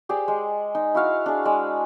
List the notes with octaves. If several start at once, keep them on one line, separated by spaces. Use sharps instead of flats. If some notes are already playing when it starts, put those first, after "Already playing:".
G4 G#4 C5 D5
G#3
D#4
E4 F#4 F5
D4 G#4
G#3 D5